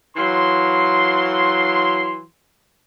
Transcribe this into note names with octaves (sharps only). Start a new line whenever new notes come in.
E3 F#3 F5 C6